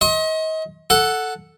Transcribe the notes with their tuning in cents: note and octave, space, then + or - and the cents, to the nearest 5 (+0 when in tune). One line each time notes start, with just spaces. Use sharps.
D#5 +35 C6 +35
A4 +0 F#5 +0